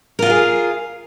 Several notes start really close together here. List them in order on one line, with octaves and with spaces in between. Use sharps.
A#4 F4 F#4 G#4